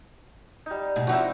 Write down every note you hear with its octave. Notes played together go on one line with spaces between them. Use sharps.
G3 D#4
G#2 B2 D#4
F3 C4 D#4 E4 F#4